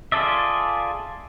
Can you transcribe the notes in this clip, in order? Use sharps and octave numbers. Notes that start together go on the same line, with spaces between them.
F4 G#4 A4 D5 E5